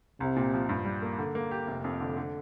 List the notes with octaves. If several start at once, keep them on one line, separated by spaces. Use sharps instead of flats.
C2 C3
A#2
F3
G2
G3
A#3
D3
A#3
G4
F1
F2
D3
D3